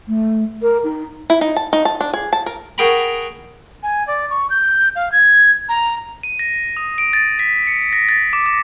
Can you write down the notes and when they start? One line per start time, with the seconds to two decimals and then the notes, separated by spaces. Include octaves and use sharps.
0.08 A3
0.62 A#4
0.84 D#4
1.30 E4
1.41 D#4
1.56 A5
1.73 D#4
1.85 A5
2.01 D4
2.13 G#4
2.33 A5
2.46 A#4
2.78 F#4 G#4 A#4 G5 A#5 B5
3.83 G#5
4.08 D5
4.30 C#6
4.50 G6
4.96 F5
5.12 G#6
5.69 A#5
6.23 D#7
6.39 A#6
6.77 D#6
6.98 D7
7.13 A6
7.39 B6
7.67 C#7
7.93 A#6
8.09 A6
8.33 D6
8.46 D6